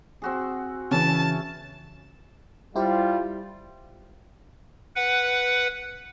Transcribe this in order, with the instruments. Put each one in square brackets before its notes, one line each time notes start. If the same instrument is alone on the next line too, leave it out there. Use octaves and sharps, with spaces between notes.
[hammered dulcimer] C4 F#4 G#4
[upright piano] C#3 E3 [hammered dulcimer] C#4 E5 [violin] A5
[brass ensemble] G3 F4 [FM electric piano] E4 G4 C5
[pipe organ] B4 F#5